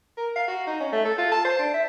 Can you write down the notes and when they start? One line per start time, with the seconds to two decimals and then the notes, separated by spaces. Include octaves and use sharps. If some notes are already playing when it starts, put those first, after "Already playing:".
0.17 A#4
0.36 F5
0.48 F#4
0.67 D#4
0.80 C#4
0.92 A3
1.05 A4
1.18 F4
1.32 A5
1.45 C5
1.59 D4
1.74 E5